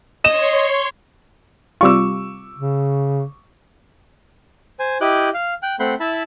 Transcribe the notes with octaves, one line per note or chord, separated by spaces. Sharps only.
C#5 D#5 C6 E7
C3 G3 F4 C#6 D6 E6
C#3
C5 G#5
E4 G4 D#5 D6 F#6 G6
F5
G5 F#6
A3 C4 F#5 B5 C6 G6
E4 E5 A5 B5